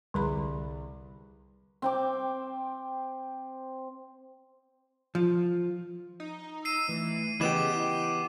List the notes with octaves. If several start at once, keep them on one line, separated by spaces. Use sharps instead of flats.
C2 D3 G#4 B5
C4 G5 D6
F3
D#4
E6 C7 D#7
E3 A3
C#3 E3 B3 G4 D#5 D6 E7
E4 G5